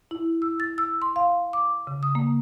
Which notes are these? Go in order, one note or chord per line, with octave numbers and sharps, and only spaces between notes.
E4
E6
A6
E6
C6
F5
D6
C#3
D#6
A#3